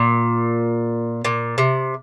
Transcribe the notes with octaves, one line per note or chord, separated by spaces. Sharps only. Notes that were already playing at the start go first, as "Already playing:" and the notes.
Already playing: A#2
A#2
C3